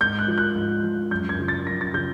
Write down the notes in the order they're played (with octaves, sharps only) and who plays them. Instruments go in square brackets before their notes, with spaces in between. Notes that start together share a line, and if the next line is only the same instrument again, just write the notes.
[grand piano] G#2 G6
F#6
F3
F#6
G#2
F3
F#2 G6
G#6
C#3 F3
A6
F#2 A#6
A6
C#3 F3 G6